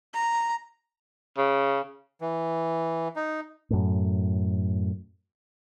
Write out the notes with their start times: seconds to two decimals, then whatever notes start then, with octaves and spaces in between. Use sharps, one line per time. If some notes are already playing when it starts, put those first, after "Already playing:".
0.14 A#5
1.38 C#3
2.21 E3
3.16 D#4
3.70 F#2 A2